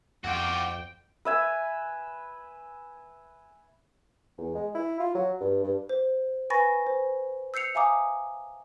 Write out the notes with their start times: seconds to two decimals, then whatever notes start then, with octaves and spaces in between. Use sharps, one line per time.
0.24 F2 F4 F#4 G5 D6
1.25 B4 E5 G#5
4.38 E2
4.55 G#3
4.75 E4
5.00 F4
5.15 F#3
5.41 G2
5.64 G2
5.89 C5
6.50 B4 G#5 B5 C#6 A6 A#6
6.87 C5
7.54 E6 G6 C7 C#7 F7
7.75 E5 F5 G#5 A#5 D6 D#6